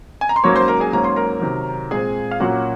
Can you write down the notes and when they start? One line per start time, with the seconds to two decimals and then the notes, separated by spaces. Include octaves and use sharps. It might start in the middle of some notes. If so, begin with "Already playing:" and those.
0.21 G#5
0.29 A#5
0.36 C6
0.44 G#2 F#3 A#3 C#4 C#5 C#6
0.56 C5 C6
0.68 A#4 A#5
0.80 G#4 G#5
0.93 G#2 F#3 A#3 C#4 A#5
1.04 C6
1.16 A#4 A#5
1.41 C3 D#3 F#3
1.91 A#2 G#3 C4 G#4 G#5
2.31 F5
2.40 A#2 F#3 A#3 C#4 F#4 F#5